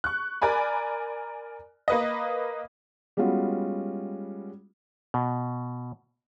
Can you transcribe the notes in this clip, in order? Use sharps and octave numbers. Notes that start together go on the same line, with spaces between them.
C#6 F#6
A#4 D5 G#5 B5
A#3 B4 D#5
G3 G#3 B3 C#4 F4 F#4
B2